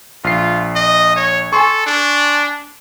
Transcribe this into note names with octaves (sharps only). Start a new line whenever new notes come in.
A#1 F4 C7
D#5
C#5
A4 G#5 C6 C#6
D4